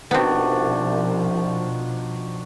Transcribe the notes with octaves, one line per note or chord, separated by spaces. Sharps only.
C2 B2 D#3 F3 B3 C4 D4 F#4